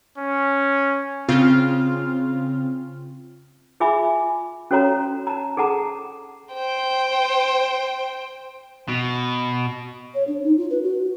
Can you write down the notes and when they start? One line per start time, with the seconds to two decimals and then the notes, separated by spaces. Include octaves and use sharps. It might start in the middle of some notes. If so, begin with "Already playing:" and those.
0.18 C#4
1.28 C#3 C4 F4 F6
3.80 F4 G#4 E5 G#5 B5 D6
4.71 C#4 F#4 A4 C#5 F5 A#5
5.27 A5 A#5
5.57 G#4 A4 F#5 A5 A#5
6.53 C5 G5
8.88 B2
10.15 C#5
10.28 D4
10.44 D#4
10.57 F4
10.70 B4
10.83 F#4